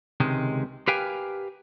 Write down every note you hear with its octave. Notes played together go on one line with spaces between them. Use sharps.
C#2 C3 D#3 G#3
G4 A#4 B4 F5 G5 G#5